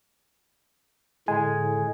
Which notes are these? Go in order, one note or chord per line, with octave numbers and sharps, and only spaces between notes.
A2 D3 G#3 G#5